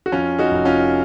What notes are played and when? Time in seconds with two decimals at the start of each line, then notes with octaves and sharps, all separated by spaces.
0.06 F#4
0.12 F2 C#4 F4
0.39 D#4 F#4
0.52 F1
0.65 C#4 F4